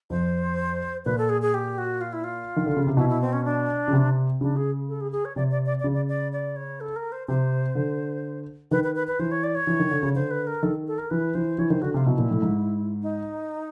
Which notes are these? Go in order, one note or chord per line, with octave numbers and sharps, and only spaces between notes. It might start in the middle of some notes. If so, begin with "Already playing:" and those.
F2 C5
A#2 B4
A4
G#4
G#4
G4
F#4
F4
E4
F4
D#3
D3
C#3
C3
B2 E4
E4
C4
C#4
D4
C#3
C3
C#3 D4
G#4
A4
G#4
G#4
C#5
C3 D5
D5
D5
D5
C#3
D5
D5
D5
C#5
A4
A#4
C5
C3 C5
D3
D#3 B4
B4
B4
B4
E3 C5
C#5
D5
C#5
E3
D#3
D3
C#3
D3 C5
B4
A#4
D#3 A4
A4
A#4
E3 B4
E3 C5
E3 C#5
D#3 C5
D3 F#4
C3 F4
B2 E4
A#2
A2
G#2
D#4